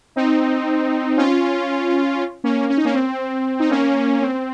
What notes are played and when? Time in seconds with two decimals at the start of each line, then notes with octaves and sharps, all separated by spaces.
0.16 C4 D#4
1.17 C#4 F4
2.44 A#3 C#4
2.70 C#4
2.77 D#4
2.85 A#3 C#4
2.94 C4
3.60 D#4
3.70 A#3 C#4
4.22 C4